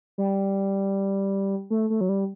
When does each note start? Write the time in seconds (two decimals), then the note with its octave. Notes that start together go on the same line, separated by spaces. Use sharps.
0.18 G3
1.70 A3
1.90 A3
2.01 F#3
2.09 G3